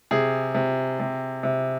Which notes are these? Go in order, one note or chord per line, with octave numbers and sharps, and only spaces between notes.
C3 G#4
C3
C3
C3